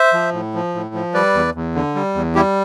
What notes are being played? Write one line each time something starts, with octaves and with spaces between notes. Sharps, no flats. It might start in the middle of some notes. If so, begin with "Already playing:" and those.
Already playing: C5 E5
F3
A2
F3
A2
F3
G3 B4 D5
E2
E2
D3
G3
E2
G3 E4 G4